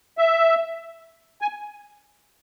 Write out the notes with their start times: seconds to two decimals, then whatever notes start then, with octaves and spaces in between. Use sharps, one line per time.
0.18 E5
1.42 G#5